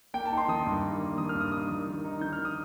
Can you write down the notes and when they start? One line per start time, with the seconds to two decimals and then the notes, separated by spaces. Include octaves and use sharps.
0.14 A#3 G5
0.25 A5
0.32 D#4
0.38 C6
0.48 D#3 D#6
0.67 G2
0.83 A#3
1.01 A#3
1.18 D#3 D#6
1.29 F6
1.35 G2
1.40 D#6
1.52 D#4 D#6
1.69 D#3
1.87 D#3
2.04 D#4
2.21 D#3 G6
2.33 F6
2.39 D#3
2.45 D#6